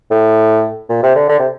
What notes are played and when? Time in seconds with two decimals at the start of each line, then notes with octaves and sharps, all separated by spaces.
0.11 A2
0.89 A#2
1.03 C3
1.15 D3
1.29 D3
1.39 C3